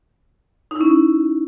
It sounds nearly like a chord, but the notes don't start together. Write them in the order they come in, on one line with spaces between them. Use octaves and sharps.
D#4 E4 C#4